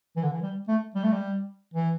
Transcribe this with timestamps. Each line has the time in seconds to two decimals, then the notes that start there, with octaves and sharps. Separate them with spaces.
0.16 E3
0.23 D3
0.32 E3
0.42 G3
0.68 A3
0.95 G3
1.04 A3
1.13 G3
1.74 E3